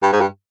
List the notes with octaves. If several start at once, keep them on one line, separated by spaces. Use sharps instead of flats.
G2
G#2
G2